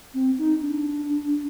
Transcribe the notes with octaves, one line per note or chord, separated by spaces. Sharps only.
C4
D#4
D4